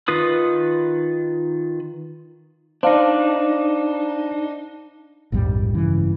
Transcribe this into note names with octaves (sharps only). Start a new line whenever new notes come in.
D#3 F4 B4 D#6
D4 D#4 C5 F5
A#1 F2 G#2 G3
G2 C#3 E3